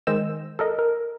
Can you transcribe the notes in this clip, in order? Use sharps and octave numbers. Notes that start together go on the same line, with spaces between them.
D#3 G#3 C5 D#5 E6 E7
A4 A#4 D#5
A#4